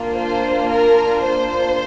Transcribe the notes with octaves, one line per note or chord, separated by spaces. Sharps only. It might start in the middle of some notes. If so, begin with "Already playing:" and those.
Already playing: A#3 D4 F4
C5
A#4
C5